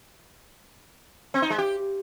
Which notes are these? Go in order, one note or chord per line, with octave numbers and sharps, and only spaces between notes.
C4
D#4
G#3
G4